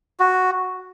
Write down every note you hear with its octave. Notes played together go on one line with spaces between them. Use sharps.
F#4